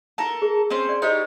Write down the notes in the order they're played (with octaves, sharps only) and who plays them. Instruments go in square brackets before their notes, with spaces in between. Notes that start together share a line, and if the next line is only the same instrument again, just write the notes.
[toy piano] E4 A5 [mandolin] A4 A#4
[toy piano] G#4
[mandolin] C4 C#4 C5
[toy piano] D5
[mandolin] D#4 G4 C#5 [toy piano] E4 C5 B5